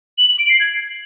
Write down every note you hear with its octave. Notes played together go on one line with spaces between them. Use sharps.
F#7
F#7
D7
C7
G#6